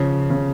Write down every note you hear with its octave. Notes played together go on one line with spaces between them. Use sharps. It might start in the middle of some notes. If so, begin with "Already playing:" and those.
Already playing: C#3 F3
C#3